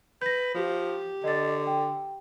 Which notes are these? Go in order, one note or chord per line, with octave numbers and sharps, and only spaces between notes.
B4 G6 A#6
F3 G4
D3 D#5 A6
G5